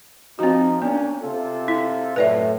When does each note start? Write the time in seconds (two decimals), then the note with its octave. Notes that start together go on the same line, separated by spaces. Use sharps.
0.39 F3 C4 D#4 F#4
0.82 A#3 B3 C#4 D4
1.22 C3 F4 A4
1.68 E4
2.16 F#2 A2 B4 D5 E5